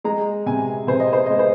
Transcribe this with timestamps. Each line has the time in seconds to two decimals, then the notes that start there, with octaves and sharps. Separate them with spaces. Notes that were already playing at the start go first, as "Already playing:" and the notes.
0.04 G#3 A#5
0.46 C3 G#5
0.87 C3 C5
1.00 D#5
1.13 C5
1.26 G#3 D#5
1.39 C5